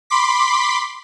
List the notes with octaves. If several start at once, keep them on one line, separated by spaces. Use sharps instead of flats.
B5 C6 D6 B6